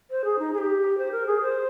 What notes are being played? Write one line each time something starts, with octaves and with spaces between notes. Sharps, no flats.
C5
G#4
D#4
G#4
G4
C5
A#4
G#4
C5